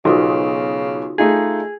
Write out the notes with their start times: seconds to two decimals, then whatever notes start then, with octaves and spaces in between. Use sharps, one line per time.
0.05 B1 C#3 B3 D#4 F4 F#4
1.18 A3 D#4 F4 G#4